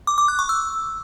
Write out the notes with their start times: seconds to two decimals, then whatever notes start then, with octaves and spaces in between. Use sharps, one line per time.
0.07 D6
0.18 D6
0.28 F#6
0.39 C#6
0.49 E6